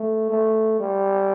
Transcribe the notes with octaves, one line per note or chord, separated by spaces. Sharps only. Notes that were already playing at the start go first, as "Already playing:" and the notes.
Already playing: A3
A3
G3